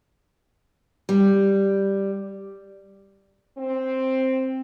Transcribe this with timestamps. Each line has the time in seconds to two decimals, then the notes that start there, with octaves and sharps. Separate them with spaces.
1.09 G3
3.58 C4